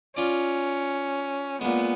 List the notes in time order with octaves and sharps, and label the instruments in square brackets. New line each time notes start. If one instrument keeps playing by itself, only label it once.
[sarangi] C#4 [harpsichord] F4 D5
[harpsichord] A#2 G#3 [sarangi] B3